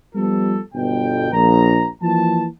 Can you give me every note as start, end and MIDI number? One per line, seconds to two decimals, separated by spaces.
0.15 0.59 53
0.15 0.59 55
0.15 0.59 59
0.15 0.59 65
0.15 0.59 69
0.74 1.32 31
0.74 1.32 47
0.74 1.32 79
1.32 1.86 34
1.32 1.86 82
2.02 2.45 52
2.02 2.45 53
2.02 2.45 58
2.02 2.45 81